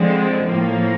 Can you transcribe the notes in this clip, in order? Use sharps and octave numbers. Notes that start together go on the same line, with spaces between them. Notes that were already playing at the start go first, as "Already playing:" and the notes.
Already playing: D3 F3 G#3 C4
A2 F3 A#3